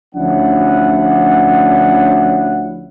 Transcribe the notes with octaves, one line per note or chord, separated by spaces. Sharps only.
D2 F3 C#4 D4 E4 F#5